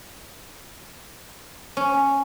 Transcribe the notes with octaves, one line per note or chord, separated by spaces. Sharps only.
C#4